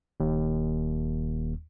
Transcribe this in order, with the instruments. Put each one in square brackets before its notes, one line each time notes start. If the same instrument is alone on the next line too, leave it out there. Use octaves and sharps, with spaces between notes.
[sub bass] D#1 [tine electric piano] D#2